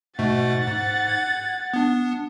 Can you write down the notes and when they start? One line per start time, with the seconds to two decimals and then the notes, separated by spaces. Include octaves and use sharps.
0.19 G#2 B2 A3 F#5 A6
0.68 G#2
1.09 G#6
1.74 B3 D4